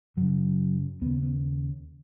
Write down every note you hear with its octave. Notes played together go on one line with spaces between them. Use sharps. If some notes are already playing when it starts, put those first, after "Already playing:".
F#2 C#3 F#3
D#2 C#3 B3
B3